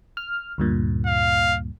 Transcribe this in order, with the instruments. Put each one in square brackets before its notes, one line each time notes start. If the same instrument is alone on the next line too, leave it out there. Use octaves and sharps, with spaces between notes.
[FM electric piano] F6
D2 G2 A#2
[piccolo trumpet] F5